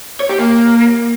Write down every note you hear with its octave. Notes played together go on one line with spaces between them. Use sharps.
C#5
G4
A#3